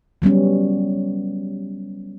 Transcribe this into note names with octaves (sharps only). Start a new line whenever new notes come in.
F#3 G3 B3 C#4